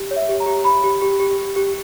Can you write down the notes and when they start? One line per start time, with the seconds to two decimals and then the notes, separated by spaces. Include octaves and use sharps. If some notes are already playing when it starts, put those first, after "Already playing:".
Already playing: G4
0.11 C#5
0.16 E5
0.29 G4
0.40 A#5
0.46 G4
0.64 G4 B5
0.84 G4
1.02 G4
1.20 G4
1.38 G4
1.56 G4